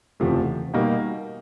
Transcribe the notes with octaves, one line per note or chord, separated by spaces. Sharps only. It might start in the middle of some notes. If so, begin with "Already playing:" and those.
F#1 E2 C3 F3 A3
B2 G3 A#3 D#4